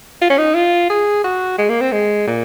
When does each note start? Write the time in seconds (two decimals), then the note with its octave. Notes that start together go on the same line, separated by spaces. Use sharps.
0.21 F4
0.30 C#4
0.38 D#4
0.55 F4
0.90 G#4
1.24 F#4
1.58 G#3
1.69 A#3
1.81 C4
1.92 G#3
2.27 A#2